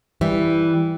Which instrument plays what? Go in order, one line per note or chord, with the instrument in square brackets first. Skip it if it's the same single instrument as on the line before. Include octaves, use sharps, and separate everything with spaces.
[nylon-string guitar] E3 G3